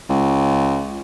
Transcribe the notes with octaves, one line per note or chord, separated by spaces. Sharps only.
C#2